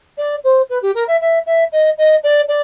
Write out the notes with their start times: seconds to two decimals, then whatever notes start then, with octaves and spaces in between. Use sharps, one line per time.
0.17 D5
0.44 C5
0.69 B4
0.82 G4
0.94 A#4
1.07 E5
1.21 E5
1.46 E5
1.72 D#5
1.97 D#5
2.23 D5
2.48 D5